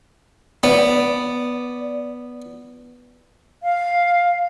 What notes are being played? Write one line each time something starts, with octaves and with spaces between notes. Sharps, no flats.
B3 D5
F5